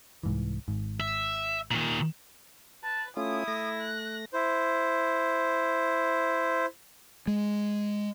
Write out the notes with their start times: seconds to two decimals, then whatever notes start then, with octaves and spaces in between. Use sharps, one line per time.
0.23 C2 G#2 E3
0.68 G#1 G#2
1.00 E5
1.71 A#2 D#3
2.84 B4 A5
3.17 A3 C#4 E4 F4 D#6
3.48 A3 A#6
3.81 F#6
4.33 E4 C5
7.27 G#3